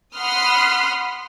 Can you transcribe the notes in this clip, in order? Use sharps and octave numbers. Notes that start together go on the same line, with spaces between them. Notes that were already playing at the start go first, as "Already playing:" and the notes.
F#5 B5 C6 D#6 F6